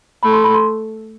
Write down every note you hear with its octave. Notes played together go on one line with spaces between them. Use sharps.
A3 B5
C6
B5
C6